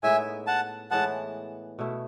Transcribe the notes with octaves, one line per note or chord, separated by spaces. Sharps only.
A2 G#3 B3 D#4 E5 G#5
F#5 A5
A2 E3 G#3 B3 F#5 A5
B2 A3 E4